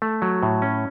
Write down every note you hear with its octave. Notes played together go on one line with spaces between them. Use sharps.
A3
F#3
A2
C#4